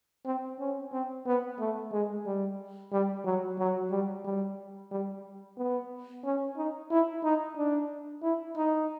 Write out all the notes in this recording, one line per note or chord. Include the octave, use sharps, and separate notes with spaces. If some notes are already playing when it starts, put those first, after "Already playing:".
C4
C#4
C4
B3
A3
G#3
G3
G3
F#3
F#3
G3
G3
G3
B3
C#4
D#4
E4
D#4
D4
E4
D#4